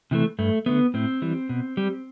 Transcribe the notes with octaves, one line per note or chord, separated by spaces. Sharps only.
C3 E3 A3
G2 A3
D3 A3 B3
A2 C4
E3 G3
B2
G3